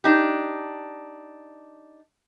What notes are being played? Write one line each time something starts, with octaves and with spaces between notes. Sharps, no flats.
D4 D#4 G4